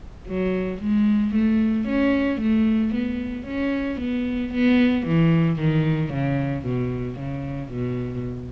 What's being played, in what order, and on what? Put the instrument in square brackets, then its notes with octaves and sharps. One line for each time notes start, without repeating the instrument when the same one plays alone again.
[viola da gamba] F#3
G#3
A3
C#4
A3
B3
C#4
B3
B3
E3
D#3
C#3
B2
C#3
B2